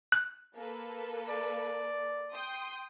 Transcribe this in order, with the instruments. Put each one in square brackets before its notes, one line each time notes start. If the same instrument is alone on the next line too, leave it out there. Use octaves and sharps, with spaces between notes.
[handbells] F#6
[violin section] A#3 A4 B4
[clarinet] D5
[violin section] G5 C6 D#6